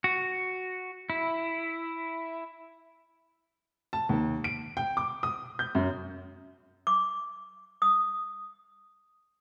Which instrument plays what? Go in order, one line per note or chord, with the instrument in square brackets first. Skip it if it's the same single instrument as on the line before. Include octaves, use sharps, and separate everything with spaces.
[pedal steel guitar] F#4
E4
[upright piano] A5
D#2
D7
G5
D6
D#6
G6
F#2
[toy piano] D6
D#6